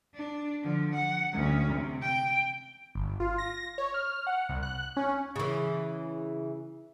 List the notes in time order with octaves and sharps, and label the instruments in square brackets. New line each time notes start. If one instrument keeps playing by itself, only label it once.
[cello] D4
D3 F3
F#5
D2 C#4
C3
G5
[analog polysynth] G1
F4
A#6
C#5
F6
F#5
C2
F#6
C#4
[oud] C#3 E3